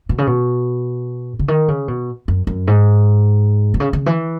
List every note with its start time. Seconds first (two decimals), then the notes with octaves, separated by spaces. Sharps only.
0.09 B2
0.18 C#3
0.27 B2
1.39 C#3
1.48 D#3
1.68 C#3
1.88 B2
2.28 F#2
2.47 F#2
2.67 G#2
3.74 B2
3.80 C#3
3.93 C#3
4.06 E3